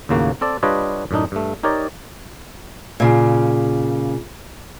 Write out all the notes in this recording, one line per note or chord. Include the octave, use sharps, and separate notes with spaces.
D#2 A2 C#3 A#3 F#4
C4 A4 D5
G3 D4 F4 B4 C#5 D#5
F#2 A2 D4 D#4
G2 A3
D#4 G4 A#4 C#5 D5
A#2 C#3